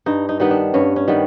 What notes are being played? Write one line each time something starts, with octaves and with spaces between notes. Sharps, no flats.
G2 D#4
D#4
D#3 G3 B3 D#4
D4
G2 C#4
C#4
D#3 G3 B3